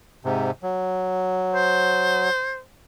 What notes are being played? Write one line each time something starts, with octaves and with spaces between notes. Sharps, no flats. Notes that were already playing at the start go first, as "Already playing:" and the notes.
G#2 C3
F#3
C5